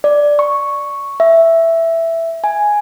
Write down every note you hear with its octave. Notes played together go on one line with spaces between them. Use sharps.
D5
C#6
E5
G#5